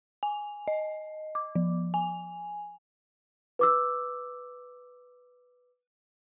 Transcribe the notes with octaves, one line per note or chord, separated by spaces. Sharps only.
G#5
D#5
D6
F3
G#5
B4 D6 E6